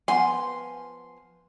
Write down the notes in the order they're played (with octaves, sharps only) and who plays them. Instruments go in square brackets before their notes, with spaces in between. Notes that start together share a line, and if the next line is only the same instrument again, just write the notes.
[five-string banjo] F3 B3 F#5 [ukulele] G#5 [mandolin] C6